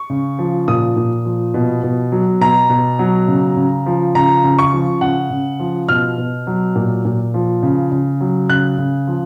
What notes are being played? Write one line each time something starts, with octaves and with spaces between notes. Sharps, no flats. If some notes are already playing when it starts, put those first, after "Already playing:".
Already playing: C#6
C#3
F3
A#2 D#6
A#2
F3
B2
B2
F#3
B2 A#5
B2
F#3
C#3
C#3
F3
C#3 A#5
C#3
C#6
F3
C#3 F#5
C#3
F3
B2 F6
B2
F#3
A#2
A#2
F3
C#3
C#3
F#3
C#3 F#6
C#3
F3